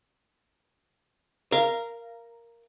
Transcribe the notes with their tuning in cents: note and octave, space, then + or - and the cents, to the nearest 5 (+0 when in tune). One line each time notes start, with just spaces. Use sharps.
A#4 +0 F5 -20